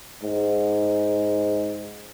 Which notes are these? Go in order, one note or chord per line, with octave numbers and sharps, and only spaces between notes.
G#2